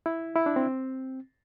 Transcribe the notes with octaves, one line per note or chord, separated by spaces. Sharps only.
E4
E4
D4
C4